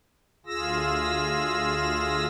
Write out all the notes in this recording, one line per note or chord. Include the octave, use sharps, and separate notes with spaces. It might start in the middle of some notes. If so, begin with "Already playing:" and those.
D2 F4 G#4 E6 A#6